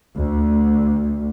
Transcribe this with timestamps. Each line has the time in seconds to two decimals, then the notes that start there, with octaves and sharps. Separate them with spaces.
0.16 D2